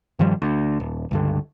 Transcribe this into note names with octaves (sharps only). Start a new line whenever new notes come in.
G2 D#3 F3 G3
D2
D#1
C#2 G2 D3